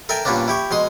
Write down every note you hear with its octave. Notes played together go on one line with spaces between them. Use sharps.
A4 A#4 E5 G5 G#5
G2 A#2 A#3 B3 C#4 D4
E4 G4 C#6
B2 G#3 C6 D#6